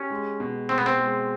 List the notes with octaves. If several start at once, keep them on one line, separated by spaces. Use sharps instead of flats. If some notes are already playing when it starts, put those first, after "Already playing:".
Already playing: C#4 G4
G#3
B2
B2 C4
B3
C4
G#3